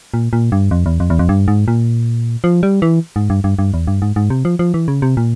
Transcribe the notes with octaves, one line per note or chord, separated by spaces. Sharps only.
A#2
A#2
G2
F2
E2
F2
E2
F2
G2
G#2
A#2
F3
G3
E3
G#2
G2
G2
G2
E2
G2
G#2
G#2
C3
F3
F3
E3
C#3
C3
A#2